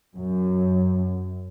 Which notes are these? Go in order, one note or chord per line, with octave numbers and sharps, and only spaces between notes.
F#2